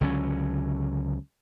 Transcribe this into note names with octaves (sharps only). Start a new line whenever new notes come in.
C#2 D3 F#3 C#4